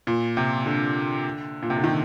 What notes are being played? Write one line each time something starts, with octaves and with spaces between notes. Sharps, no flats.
A#2
C3
D3
A#2
C3
D3
D#3